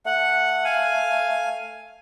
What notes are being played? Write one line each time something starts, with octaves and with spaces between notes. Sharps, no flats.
A3 F#5
F5 G#5